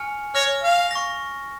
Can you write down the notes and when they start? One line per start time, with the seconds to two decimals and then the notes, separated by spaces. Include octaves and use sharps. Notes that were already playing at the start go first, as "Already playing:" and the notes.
Already playing: G#5 C#6 F6 C#7 F7
0.35 C#5 C#6 F6 A#6
0.63 F5
0.91 C#6 F6 A#6